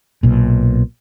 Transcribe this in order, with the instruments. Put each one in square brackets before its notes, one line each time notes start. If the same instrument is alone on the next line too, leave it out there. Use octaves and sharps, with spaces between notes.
[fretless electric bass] B1 A#2